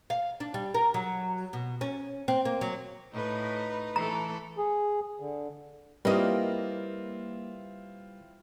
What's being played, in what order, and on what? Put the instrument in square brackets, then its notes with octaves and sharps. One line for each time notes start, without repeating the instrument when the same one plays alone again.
[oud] F5
D4
G3
A#4
F#3
B2
C#4
C4
A#3
F#3
[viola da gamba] A2 [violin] D#4 B4
[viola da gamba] E3 A3 A4 [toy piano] A#5
[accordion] G#4
D3
[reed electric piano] G3 B4 [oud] A#3 D#5 [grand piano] C4 E4 F4